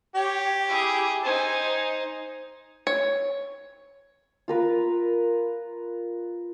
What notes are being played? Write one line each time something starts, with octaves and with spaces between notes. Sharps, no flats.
G4 C#5
E4 G#4
D#4 C5 G#5
C#5
F4 A#4 B4